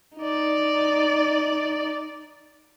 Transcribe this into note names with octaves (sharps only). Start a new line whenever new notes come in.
D#4 D5